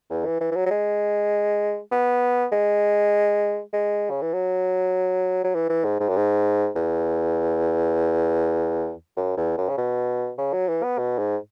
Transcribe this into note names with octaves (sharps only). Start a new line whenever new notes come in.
E2
E3
E3
E3
F#3
F#3
G#3
B3
G#3
G#3
C#3
E3
F#3
F#3
E3
E3
G#2
G#2
F#2
G#2
E2
F#2
E2
F#2
C#3
B2
C#3
F#3
E3
B3
B2
G#2